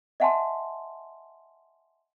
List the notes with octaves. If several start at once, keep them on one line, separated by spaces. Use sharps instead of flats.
D#5 E5 F#5 G#5 A5 C6